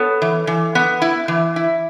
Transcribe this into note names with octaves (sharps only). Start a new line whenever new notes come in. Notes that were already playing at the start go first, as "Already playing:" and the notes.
Already playing: B3 A4 C#5
E3
E3
B3
E4
E3
E4